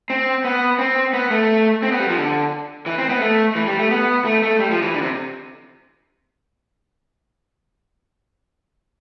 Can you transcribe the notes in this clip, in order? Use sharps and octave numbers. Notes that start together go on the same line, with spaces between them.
C4
B3
C4
B3
A3
C4
B3
G3
F3
D3
E3
C4
B3
A3
E3
G3
A3
B3
A3
A3
G3
F3
E3
D3
C3